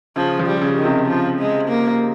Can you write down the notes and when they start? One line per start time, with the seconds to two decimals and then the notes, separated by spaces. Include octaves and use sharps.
0.16 C#3 F3
0.39 F3
0.47 G3
0.61 C#3
0.78 D#3
0.85 C3
1.07 F3
1.39 G#3
1.69 A#3